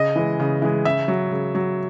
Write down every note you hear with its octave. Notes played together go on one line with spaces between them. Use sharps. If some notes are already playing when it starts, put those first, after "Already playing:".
Already playing: C#3 D#5
E3 G#3
C#3
E3 G#3
C#3 E5
F#3
C#3
F#3